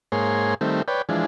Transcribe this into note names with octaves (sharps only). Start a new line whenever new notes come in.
G#2 A#3 G#4 C#5 C6
D#3 G3 A3 C4
B4 C#5 D5 G5
E3 F3 G#3 D4